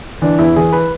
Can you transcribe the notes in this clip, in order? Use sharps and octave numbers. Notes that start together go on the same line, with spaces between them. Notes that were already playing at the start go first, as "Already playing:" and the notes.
E3 D4
E2 E4
E3 G#4
B4